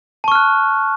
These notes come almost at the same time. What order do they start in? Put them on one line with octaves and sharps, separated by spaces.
A5 C#6 F6 F#6